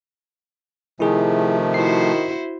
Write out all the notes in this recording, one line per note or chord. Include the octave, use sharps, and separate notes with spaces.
C3 D#3 F3 A3 E4 G#4
E4 F#4 C5 C7